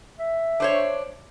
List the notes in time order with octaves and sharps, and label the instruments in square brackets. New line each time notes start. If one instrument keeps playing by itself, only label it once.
[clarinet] E5
[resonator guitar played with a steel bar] D4 C5 C#5